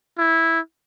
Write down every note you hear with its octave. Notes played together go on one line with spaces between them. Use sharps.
E4